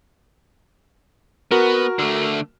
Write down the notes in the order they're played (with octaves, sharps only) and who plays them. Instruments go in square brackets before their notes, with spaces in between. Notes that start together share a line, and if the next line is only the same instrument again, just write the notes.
[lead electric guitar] B3 [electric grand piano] F#4 A#4
[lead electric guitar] D3 A3